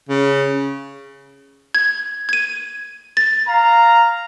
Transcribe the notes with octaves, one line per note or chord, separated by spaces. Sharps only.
C#3
G#6
G#6 D#7
A6
F5 A#5